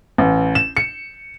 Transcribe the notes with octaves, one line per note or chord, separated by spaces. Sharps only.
A1
E7
C#7